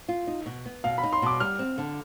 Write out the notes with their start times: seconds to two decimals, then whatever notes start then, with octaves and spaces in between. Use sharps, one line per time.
0.09 F4
0.27 D#4
0.46 B2
0.66 B3
0.84 B2 F5
0.98 B5
1.03 D#4
1.13 C6
1.22 B2 D6
1.40 G3 F6
1.59 C4
1.78 D3